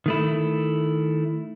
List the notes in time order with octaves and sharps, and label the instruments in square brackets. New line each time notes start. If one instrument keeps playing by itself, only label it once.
[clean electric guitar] D#3 A3 E4